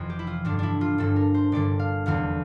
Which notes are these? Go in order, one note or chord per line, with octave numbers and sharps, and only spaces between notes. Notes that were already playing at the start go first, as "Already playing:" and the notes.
Already playing: F1 F2 E3
G4
E4
F4
A1 G2 D3 D4
D4 E4
F4
G1 G2 D3 A4
A#4
C5
G1 G2 D3 D5
F5
F1 E2 D3 F5